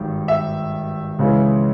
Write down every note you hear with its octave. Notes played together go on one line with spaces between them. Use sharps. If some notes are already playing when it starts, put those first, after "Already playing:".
Already playing: G#1 G2 D#3
E5
C#2 C#3 E3